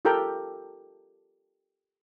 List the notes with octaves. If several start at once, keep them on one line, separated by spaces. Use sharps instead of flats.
F4 G4 A4 A#4 G5 A#5